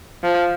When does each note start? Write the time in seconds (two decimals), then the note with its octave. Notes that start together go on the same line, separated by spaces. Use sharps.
0.24 F3